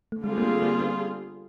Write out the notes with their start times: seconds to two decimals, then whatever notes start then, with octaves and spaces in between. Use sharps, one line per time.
0.12 A3
0.23 D3 G3 G#3 C4 F4 G#4
0.38 A#3
0.43 A3
0.62 A#3
0.81 B3